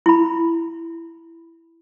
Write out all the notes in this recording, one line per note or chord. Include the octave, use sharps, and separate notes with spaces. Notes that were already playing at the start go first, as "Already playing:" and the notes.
E4 B5